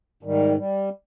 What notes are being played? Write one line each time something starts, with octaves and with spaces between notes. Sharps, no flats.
G#2 D#3 G3
G3